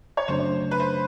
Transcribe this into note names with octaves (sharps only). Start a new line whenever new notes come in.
C#5
F#2 C#3 F#3 A3 D4 C5
B4
C5